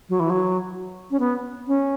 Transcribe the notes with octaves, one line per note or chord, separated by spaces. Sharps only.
F#3
E3
F#3
C#4
B3
C#4